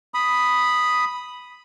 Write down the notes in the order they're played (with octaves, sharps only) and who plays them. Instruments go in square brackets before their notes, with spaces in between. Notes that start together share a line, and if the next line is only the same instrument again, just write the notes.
[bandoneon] B5 D#6